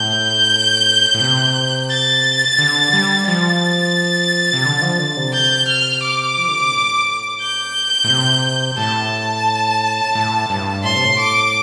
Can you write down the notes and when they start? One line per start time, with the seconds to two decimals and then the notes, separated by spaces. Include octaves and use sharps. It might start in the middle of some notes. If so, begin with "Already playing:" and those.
Already playing: A2 G6
1.14 A2
1.21 C3
1.90 A6
2.59 D3
2.93 G3
3.28 F3 A6
4.53 C3
4.65 D3
4.82 F3
4.99 D3
5.17 C3
5.34 G6
5.68 F6
6.03 D6
6.37 F3
6.48 D3
6.60 C3
6.72 A2
7.41 G6
8.04 A2
8.09 C3
8.77 A2 A5
10.15 A2
10.50 G2
10.84 A2 C6
10.95 C3
11.05 A2
11.19 D6